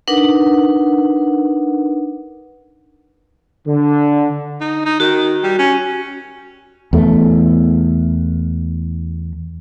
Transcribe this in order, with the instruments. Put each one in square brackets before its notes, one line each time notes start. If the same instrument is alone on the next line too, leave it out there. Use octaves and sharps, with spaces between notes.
[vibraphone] D4 D#4 A#4 B4 F#5
[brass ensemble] D3
[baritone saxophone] D#4
D#4
[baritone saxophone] D#3 [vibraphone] F#4
[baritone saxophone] G3
C#4
[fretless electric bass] E2 A3